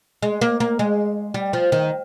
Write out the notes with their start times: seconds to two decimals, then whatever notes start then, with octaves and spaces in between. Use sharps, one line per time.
0.22 G#3
0.41 A#3
0.60 A#3
0.79 G#3
1.34 G3
1.53 F3
1.72 D#3